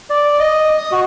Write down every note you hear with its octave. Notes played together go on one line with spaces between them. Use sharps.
D5
D#5
D#6
F#4